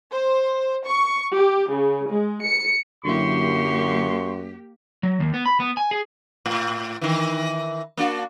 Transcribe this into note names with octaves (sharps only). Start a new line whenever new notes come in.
C5
C#6
G4
C#3
G#3
C#7
F#2 D3 F#3 A#3 E4 G4 C6 C#6
F#3
D#2
B3
B5
B3
G#5
G#4
A2
D#3 E3
A#3 D4 F#4